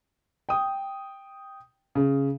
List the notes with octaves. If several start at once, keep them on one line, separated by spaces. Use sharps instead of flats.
G5 D#6
C#3